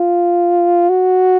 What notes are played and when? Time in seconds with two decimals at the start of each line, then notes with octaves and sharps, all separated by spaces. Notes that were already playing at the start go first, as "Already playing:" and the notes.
Already playing: F4
0.90 F#4